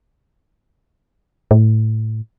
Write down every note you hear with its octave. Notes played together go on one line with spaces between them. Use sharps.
A2